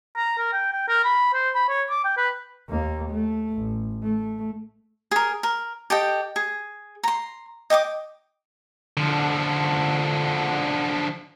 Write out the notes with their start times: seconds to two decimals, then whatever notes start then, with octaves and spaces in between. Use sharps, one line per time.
0.16 A#5
0.38 A#4
0.53 G5
0.73 G5
0.88 A#4
1.04 B5
1.34 C5
1.55 B5
1.69 C#5
1.90 D6
2.04 G5
2.17 B4
2.69 D#2 A#3
3.10 A3
3.53 A1
4.03 A3
5.11 G#4 A#4
5.43 A#4
5.90 G4 A4 D#5 G5
6.36 G#4
7.03 A#5 C6
7.70 D#5 G5 D6 D#6
8.97 D3 F3